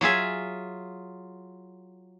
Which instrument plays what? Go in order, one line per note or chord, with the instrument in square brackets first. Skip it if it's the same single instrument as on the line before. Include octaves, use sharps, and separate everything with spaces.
[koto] F#3 F4 G#4 E5